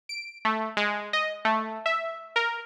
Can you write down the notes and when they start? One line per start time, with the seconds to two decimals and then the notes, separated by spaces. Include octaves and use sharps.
0.09 D7
0.45 A3
0.77 G#3
1.13 D#5
1.45 A3
1.86 E5
2.36 A#4